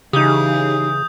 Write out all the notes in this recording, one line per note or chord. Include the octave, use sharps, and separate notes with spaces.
C#3 E3 D#4 G4 G#4 D#6 G6